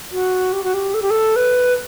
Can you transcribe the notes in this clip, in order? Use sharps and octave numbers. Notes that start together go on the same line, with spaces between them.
F#4
G4
F#4
G4
A4
G4
A4
B4